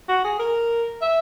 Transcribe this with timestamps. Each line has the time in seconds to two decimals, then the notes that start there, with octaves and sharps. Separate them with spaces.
0.09 F#4
0.24 G#4
0.39 A#4
1.02 E5